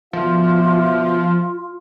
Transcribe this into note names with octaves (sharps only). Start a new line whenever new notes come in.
B2 D3 F3 F4 E5